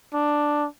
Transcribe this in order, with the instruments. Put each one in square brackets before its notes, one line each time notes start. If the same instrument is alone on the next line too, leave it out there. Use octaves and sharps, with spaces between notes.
[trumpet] D4